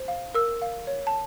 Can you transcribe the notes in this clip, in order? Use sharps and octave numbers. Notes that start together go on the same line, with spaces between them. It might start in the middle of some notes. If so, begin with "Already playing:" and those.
Already playing: C5
F5
A#4 E6
F5
C#5
A5